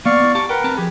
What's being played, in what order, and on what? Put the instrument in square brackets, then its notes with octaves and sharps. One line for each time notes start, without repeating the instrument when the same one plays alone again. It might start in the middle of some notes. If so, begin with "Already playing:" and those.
[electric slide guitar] A#3 B3 [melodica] D5 F5 C#6
[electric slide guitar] B3 E4
[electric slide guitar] G4 A5 A#5 [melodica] C#6
[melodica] A#4 B4 [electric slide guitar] F#5 G5
[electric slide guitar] C4 A5 A#5
[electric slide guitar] F3 G#4 [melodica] G4